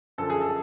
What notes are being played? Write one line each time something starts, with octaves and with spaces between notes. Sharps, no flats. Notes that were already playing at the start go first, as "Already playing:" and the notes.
F#2 D3 F3 A4
G#4
A4